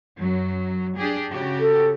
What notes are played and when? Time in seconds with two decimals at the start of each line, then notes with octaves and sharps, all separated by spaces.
0.18 F#2 F#3
0.96 D4 G4 G#4
1.30 C#3 F#4 G4
1.60 A4